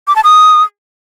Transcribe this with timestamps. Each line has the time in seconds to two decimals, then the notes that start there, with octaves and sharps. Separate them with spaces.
0.08 D6
0.16 A5
0.24 D#6